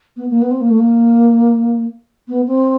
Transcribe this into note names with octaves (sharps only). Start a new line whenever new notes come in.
B3
A#3
B3
C4
A#3
A3
A#3
B3
C4